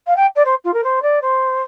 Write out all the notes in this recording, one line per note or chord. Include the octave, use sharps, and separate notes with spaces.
F5
G5
D5
C5
F4
A#4
C5
D5
C5